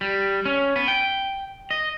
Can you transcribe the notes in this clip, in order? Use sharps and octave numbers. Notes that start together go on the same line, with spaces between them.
G3
C#4
B3
G5
D#5